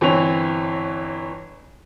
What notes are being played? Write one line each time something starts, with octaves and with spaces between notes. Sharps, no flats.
G1 E3 C4 C#5 F7